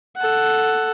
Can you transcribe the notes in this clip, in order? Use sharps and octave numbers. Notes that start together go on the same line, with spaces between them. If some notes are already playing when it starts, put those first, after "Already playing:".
A4 F#5